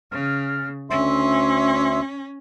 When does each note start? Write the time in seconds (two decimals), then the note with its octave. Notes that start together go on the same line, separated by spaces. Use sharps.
0.12 C#3 F6
0.90 D2 C#4 E5 C6